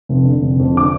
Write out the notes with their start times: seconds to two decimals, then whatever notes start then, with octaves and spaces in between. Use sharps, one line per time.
0.09 F1
0.25 D3
0.42 F1
0.59 F2
0.75 D3 D6